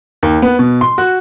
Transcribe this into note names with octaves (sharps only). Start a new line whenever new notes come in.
D#2
B3
B2
C6
F#4